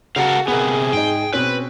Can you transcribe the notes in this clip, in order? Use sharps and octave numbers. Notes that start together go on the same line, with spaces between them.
C#3 F#4 A4 A#4 F5
C3 B3 G#4 A#4 F#5
G#2 D#4 G5
B2 C4 C#4 B4